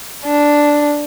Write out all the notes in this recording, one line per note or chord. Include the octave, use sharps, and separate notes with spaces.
D4